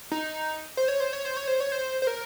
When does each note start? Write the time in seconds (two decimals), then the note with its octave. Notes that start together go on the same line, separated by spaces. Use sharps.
0.11 D#4
0.77 C5
0.88 C#5
1.00 C5
1.13 C#5
1.25 C5
1.37 C#5
1.47 C5
1.60 C#5
1.72 C5
2.02 C5
2.07 A#4